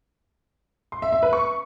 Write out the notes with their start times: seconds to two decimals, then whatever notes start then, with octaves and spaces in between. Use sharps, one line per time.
0.92 C6
1.02 E5
1.12 E5
1.23 B4
1.33 C#6